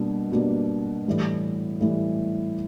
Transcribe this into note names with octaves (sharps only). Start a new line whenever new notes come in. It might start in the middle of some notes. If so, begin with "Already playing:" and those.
Already playing: B2 G3 A#3 D4
B2 G3 A#3 D4
A2 E3 G3
A2 E3 G3